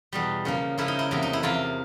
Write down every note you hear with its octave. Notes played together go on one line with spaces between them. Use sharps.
E2 B2 G3
C#3 F3 A#3
C#3 F3 A#3 E4
D#4
E4
E2 C3 F3 A#3
D#4
E4
E2 C3 F3 A#3 F4